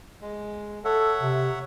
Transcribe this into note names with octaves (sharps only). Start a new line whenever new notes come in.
G#3
A4 C#5 E5 F#5
C3